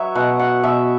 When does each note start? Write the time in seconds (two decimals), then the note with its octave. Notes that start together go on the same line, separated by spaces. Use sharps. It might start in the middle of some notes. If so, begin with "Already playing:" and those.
Already playing: F#3 B4 C#5 E5
0.15 B2 F#5
0.39 F#5
0.63 B2 E5